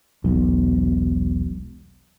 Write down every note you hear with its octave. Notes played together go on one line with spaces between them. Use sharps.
E1 B1